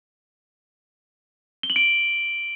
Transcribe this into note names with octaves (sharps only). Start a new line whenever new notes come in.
G7
F#7
D7